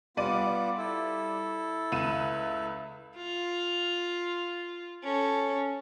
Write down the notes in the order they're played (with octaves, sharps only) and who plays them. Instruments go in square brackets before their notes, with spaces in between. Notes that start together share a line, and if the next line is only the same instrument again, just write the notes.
[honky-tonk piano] G3 D5 D#7 [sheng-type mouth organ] B3 F4 D6
[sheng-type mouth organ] E4 A4
[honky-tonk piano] C#2 D#7 E7
[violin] F4
C#4 A4